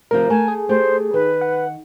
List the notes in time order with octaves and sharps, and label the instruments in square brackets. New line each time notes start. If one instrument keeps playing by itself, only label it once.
[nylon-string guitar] D2 C3 F3 [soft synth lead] A#4
[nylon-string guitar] A3 A5 [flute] G#5
[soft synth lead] G#4
[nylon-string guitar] A3 G4 [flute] C5
[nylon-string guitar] D#3 [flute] B4
[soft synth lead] F#5